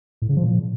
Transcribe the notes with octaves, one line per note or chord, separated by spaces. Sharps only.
A2
C#3
F3
A#2